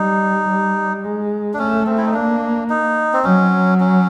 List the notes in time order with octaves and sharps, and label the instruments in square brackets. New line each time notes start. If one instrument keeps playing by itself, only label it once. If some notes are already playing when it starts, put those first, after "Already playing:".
Already playing: [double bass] G3 [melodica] D#4
[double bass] G3
G#3
[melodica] D4
[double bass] A3 [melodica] C#4
[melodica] C4
E4
D#4
[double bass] A#3 [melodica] D4
[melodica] D#4
C4
[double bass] F#3 [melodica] C#4
[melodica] C#4